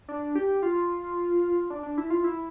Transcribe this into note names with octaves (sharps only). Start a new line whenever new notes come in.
D4
G4
F4
D4
D4
E4
F4
E4